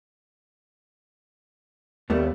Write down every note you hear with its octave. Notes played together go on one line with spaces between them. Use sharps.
D#2 G3 A3 B3